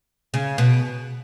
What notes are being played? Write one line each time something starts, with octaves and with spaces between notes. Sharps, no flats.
C#3
B2